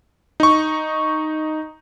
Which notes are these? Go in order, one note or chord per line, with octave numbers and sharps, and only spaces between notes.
D#4 C#6